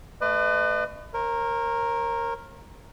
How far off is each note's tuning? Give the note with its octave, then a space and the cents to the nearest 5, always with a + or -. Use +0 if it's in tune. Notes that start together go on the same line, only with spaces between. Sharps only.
A3 -5 B4 +25 D#5 -45
A#4 +0 C#5 -45